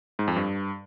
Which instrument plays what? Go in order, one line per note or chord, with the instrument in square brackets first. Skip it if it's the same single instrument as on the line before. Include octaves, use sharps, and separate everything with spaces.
[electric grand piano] G#2
F2
G2